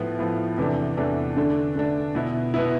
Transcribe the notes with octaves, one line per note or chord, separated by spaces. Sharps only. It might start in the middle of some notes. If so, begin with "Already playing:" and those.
Already playing: A2 F3 B3
A2 F3 B3
E2 C3 E3 A3 D4
E2 C3 E3 A3 D4
D3 A3 D4
D3 A3 D4
B2 B3 E4
B2 B3 E4